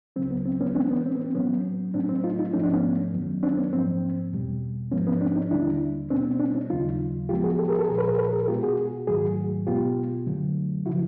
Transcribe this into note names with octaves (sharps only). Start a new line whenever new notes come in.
C#2 C#3 F#3 C4
B3
C4
B3 C#4
A2 E3 G#3 B3 C4 D4
B3 C#4
C4
B3
C4
A2 F#3 A#3 B3 C#4
A2 F#3 A3 C4 D4
C4
D#4 F4
D#4 F4
G#2 F3 A3 C#4 D#4
C4 D4
B3 C#4
F#2 D#3 F#3 B3
C4 D4
B3 C#4
G#2 F3 A#3 C4
E2 B2 G3
G#2 F3 G#3 B3 C#4
B3 C#4
C4 D4
C#4 D#4
D#2 D3 G3 A#3 D4 E4
B2 G3 B3 C4 D4
C4
C4 D4
C#4 D#4
D#2 C#3 F#3 A#3 D#4 F4
A2 F3 G#3 B3 F4 G4
F#4 G#4
G4 A4
G#4 A#4
G4 A4
C2 A#2 F3 G#4 A#4
A4 B4
G#4 A#4
A4 B4
G#4 A#4
B2 G#3 B3 F4 G4
F#4 G#4
G#2 D#3 F#3 A3 F#4 G#4
B2 G#3 B3 F4 G4
F#2 D3 F#3 A3
C#3 F3 E4 F#4